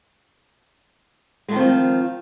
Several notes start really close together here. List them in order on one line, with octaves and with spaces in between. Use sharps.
G#3 A3 D#3 C4 F3